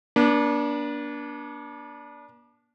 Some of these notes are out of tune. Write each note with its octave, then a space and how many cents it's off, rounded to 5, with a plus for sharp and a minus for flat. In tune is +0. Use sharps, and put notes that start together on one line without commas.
A#3 +45 D4 -15